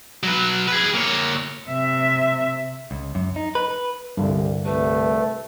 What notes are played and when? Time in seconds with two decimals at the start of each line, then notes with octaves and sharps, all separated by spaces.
0.23 F#3 B4
0.68 G#4 B4
0.95 A#3 C#5
1.68 C3 E5
2.91 C#2
3.15 F#2
3.36 D#4
3.55 B4
4.17 C2 G2 D3
4.65 C2 A3 B4